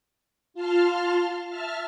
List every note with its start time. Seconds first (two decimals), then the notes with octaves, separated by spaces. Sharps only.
0.54 F4 A5 C6 F6
1.50 E5 A5 F6